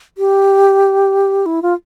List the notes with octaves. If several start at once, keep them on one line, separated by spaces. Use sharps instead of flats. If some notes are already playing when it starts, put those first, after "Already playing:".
G4
E4
F4